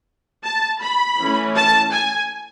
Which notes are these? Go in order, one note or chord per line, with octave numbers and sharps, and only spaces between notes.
A5
B5
E3 A3 C#4
A5
G#5